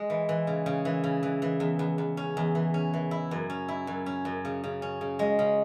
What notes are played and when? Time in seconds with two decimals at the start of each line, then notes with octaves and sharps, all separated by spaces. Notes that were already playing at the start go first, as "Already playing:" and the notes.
Already playing: G#3
0.10 E3
0.29 E3
0.47 C#3
0.66 C#3
0.85 E3
1.04 C#3
1.23 E3
1.42 E3
1.60 E2
1.79 E2
1.98 E2
2.17 C#4
2.37 E2
2.55 E3
2.74 C#4
2.94 E3
3.11 E4
3.31 F#2
3.50 C#4
3.68 E4
3.87 F#2
4.06 C#4
4.25 F#2
4.45 C#3
4.64 C#3
4.82 C#4
5.01 C#3
5.19 G#3
5.39 C#3